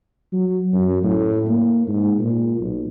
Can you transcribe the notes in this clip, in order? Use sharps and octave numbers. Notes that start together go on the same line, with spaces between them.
F#3
F#2
A2
A#3
G#2
A#2
B1